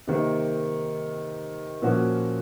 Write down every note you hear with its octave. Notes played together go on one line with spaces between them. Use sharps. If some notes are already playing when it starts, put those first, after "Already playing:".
C3 D#3 A#3
A#2 F3 A#3 C#4 F#4